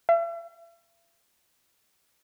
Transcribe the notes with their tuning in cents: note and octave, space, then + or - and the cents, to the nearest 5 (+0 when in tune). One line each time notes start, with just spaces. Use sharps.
E5 +40